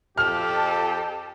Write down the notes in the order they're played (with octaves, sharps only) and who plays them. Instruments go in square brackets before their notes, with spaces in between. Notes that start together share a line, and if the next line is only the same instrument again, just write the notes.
[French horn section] F2 [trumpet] G4 [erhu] A4 [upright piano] F6